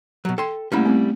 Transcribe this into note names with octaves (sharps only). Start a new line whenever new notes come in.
B2 F#3
A4 G5 C6
G3 A3 A#3 C#4 E4
A3 C4